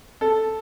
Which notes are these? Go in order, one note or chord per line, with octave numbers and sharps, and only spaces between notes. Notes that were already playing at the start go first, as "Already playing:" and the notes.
A4